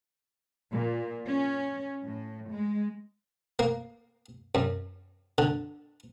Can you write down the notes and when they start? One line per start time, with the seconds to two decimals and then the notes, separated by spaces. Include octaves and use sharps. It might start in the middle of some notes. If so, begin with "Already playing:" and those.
0.71 A#2
1.25 C#4
2.02 A2
2.50 G#3
3.59 A#3
4.55 F#2
5.38 D3